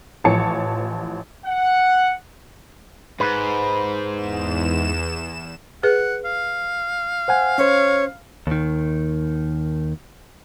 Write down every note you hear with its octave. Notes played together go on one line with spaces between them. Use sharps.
A1 E3 F3 C#5 A5 C#7
F#5
G#2 B4
E2 E7
G#4 B4 F#5
F5
C5 F#5 G#5
C#4 C5 C#5
D#2 D#3